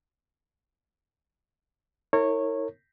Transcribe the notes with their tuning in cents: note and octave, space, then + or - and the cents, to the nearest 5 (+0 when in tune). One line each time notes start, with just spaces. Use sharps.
E4 -45 A#4 -35 C#5 -15